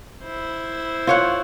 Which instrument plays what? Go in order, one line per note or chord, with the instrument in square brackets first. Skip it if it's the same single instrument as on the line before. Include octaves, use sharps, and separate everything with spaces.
[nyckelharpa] E4 C5
[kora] F4 C#5 F#5